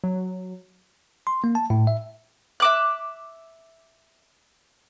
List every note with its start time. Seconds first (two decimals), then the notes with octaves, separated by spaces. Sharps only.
0.04 F#3
1.27 C6
1.44 A#3
1.55 A5
1.70 A2
1.87 E5
2.60 E5 D6 F#6